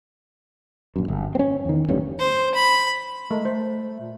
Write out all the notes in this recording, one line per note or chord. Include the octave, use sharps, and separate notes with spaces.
A#1 F#2
G1
C4 C#4
E2 D#3
D1 A1 G2 C#4
C5
B5
G#3 A3 A#4
A3 C5
A#2